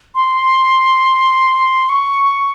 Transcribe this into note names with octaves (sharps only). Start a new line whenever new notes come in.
C6
C#6